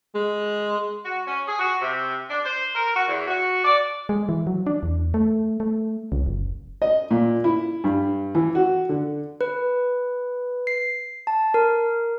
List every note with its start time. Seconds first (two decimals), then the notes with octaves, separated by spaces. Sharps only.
0.15 G#3
1.03 F#4
1.27 C#4
1.47 G#4
1.59 F#4
1.81 C3
2.30 D4
2.45 C5
2.75 A#4
2.95 F#4
3.07 E2
3.27 F#4
3.64 D5
4.09 G#3
4.29 E3
4.47 F#3
4.67 D4
4.83 E2
5.14 A3
5.60 A3
6.12 C#2
6.26 F#1
6.82 D#5
7.11 A#2
7.44 E4
7.84 G2
8.35 E3
8.55 F#4
8.89 D3
9.41 B4
10.67 C7
11.27 A5
11.54 A#4